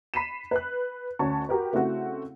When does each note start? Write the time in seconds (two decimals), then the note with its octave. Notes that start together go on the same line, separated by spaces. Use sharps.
0.14 B5 B6 C7 D#7 E7
0.51 B4 F#6
1.19 D2 C#4 A5 C#6
1.49 F#4 G4 A#4 B4
1.73 C#3 A3 C4 E4 F#4 F#5